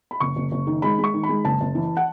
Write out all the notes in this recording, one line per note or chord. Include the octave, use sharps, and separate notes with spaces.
B5
F#1 C#6
F#1
F#1
D#3
G#3 B5
G#3
C#6
D#3
B5
G#3
F#1 A5
F#1
E3
F#5